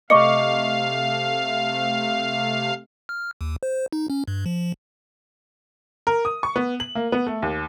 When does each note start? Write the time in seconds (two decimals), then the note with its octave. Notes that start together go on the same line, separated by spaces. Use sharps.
0.10 C3 A3 D#5 F5 C#6 D6 C#7
3.09 F6
3.41 D#2
3.63 C5
3.93 D#4
4.10 C#4
4.27 G2
4.46 F3
6.07 A#4
6.25 D#6
6.43 C#6
6.56 B3
6.80 F#7
6.95 A#3
7.12 B3
7.27 A3
7.42 D#2